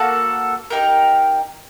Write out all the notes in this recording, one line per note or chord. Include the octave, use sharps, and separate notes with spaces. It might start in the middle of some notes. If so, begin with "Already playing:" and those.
Already playing: A#3 F#4 A4
D#4 G4 A#4